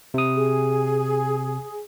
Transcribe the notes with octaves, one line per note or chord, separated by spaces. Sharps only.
C3 D#6
G#4